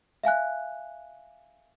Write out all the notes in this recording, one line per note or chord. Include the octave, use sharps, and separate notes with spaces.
E5 F5 G#5 F#6